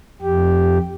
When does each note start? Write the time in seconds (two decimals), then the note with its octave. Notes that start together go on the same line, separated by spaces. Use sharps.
0.22 F2 G4